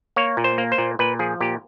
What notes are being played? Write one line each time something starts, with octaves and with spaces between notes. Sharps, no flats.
A#3 C#5
A#2
C5
A#3
C5
A#2
A#2 B4
F3 G#4
A#2 G4